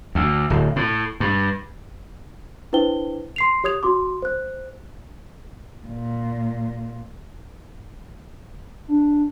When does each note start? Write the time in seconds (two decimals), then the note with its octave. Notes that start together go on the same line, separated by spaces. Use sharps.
0.15 D2
0.50 D1
0.76 A2
1.20 G2
2.73 D4 E4 B4 C5 G5 G7
3.36 C6 C7 F7
3.64 G4 C#5 D#6 G#6 F7
3.83 F#4 C6 D6
4.22 C5 F#6
5.87 A#2
8.88 D4